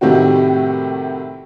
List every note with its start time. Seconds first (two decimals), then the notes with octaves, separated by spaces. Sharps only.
0.01 A2 C3 D#3 G3 C4 F#4